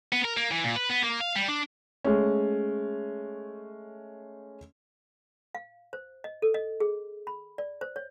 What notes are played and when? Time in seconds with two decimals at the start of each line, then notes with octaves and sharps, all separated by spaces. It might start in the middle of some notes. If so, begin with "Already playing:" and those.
0.12 B3
0.25 A#4
0.37 A#3
0.51 E3
0.64 A#2
0.76 B4
0.90 B3
1.03 A#3
1.21 F5
1.36 G3
1.48 D4
2.04 G#3 A3 C#4
5.55 F5
5.93 C5
6.24 D#5
6.42 A4
6.54 D#5
6.80 G#4
7.27 B5
7.58 D5
7.81 C5
7.96 C#5